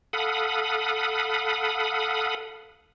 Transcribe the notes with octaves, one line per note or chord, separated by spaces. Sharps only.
A4 F5 F#5 B5 D#6